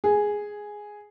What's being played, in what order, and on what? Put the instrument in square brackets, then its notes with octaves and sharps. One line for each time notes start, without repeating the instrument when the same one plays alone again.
[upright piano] G#4